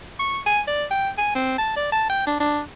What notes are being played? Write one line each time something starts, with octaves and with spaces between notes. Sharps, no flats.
C#6
G#5
D5
G5
G#5
C4
A5
D5
A5
G5
D4
D4